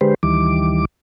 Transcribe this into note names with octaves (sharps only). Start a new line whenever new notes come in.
D3 G#3 G4 B4 C5
D2 D#3 E3 G3 D6